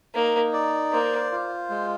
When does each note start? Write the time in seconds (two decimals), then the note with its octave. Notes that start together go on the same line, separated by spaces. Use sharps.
0.15 A#3 D#4
0.53 D5
0.93 A#3 C5
1.32 F4
1.70 G#3